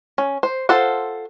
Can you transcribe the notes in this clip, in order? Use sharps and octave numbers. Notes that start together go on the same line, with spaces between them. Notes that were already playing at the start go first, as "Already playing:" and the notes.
C#4
C5
F4 A4 C5 F5 F#5